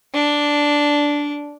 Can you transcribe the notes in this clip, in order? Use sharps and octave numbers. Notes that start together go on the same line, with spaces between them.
D4